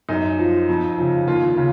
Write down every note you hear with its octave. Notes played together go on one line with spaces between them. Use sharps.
F#2 D#4
F3
F2
C#3 F3
D#2 F4
C#3